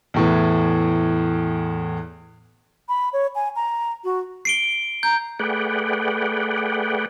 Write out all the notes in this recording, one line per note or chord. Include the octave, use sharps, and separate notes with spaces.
E2 A2 E3
B5
C#5
G#5
A#5
F#4
C7 D7 G7
A#5 G6
A3 G#4 B4 D5 F#5 G5